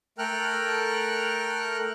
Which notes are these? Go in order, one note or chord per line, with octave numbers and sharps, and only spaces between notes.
A3 A4 A#4 G5 F6 F#6